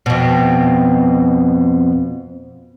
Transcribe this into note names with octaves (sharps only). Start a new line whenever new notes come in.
F2 B2